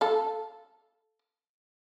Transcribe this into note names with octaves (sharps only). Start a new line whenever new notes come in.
A4 F5